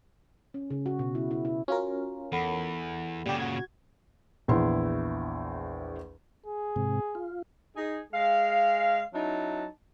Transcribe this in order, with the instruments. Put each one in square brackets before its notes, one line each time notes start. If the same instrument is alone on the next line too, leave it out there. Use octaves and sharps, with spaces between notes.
[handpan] C#4
C#3
F#4
B2
E4
E4
E4
[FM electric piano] C#4 F4 A#4 [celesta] F#4
[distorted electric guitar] E2 [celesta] A4 F#5 B5
[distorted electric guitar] A#2 C#3 [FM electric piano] G3 G4
[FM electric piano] F#4 G#6
[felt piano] A#1 E2 E4 C6
[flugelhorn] G#4
[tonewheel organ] G#2 C3
F4
[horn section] D#4 G#4
G#3 G#4 F5
F#3 C#4 D#4 E4 A5